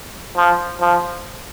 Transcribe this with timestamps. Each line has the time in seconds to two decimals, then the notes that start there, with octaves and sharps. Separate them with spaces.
0.37 F3
0.81 F3